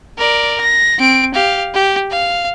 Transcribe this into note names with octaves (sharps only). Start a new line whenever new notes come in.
A#4 D5
A#6
C4 D7
G4 F5
G4
F5